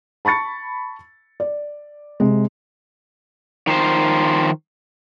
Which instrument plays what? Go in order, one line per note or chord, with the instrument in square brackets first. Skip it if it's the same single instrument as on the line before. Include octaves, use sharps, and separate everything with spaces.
[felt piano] A5 B5 C#6 A6 C#7
D5
C3 G#3
[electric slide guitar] D#3 F3 C5